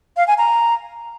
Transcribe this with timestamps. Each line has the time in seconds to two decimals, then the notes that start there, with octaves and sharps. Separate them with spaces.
0.17 F5
0.28 G#5
0.38 A#5